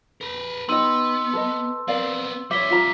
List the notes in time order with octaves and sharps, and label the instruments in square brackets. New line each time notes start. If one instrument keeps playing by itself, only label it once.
[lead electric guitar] A#4 B4
[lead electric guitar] B3 [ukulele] D#4 G4 D#5 [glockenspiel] C6 E6 D#7
[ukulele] A4 B4 D#5
[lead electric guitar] B3 C4 [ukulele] A#4 D5 F5
[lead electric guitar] G3 A#4 [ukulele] C#5 E5 [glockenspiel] D6 B6 G7
[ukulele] F4 E5 A#5 [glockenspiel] B6